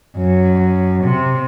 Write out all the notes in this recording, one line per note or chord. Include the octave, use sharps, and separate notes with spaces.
F#2
C3